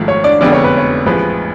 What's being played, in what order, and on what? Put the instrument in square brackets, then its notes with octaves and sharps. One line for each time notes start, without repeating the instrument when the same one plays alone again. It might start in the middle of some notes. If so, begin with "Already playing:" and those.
Already playing: [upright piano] G#1 G#2 F3 A3
[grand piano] C#5
D4 D5
[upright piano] F1 F2 D3 G#3 B3 [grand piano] D5
[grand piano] C#5
B4
C#5
[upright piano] A1 A2 F3 G#3 [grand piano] B4